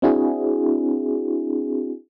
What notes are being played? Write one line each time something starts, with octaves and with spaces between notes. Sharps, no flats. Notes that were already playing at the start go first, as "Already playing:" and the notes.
C4 D4 E4 F#4 G#4